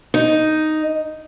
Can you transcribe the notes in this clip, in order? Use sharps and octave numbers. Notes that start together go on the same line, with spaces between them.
D#4